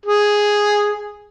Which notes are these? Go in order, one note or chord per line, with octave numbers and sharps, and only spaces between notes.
G#4